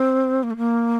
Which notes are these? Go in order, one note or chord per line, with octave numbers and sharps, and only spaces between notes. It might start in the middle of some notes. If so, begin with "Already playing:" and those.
Already playing: C4
A#3
A3
A#3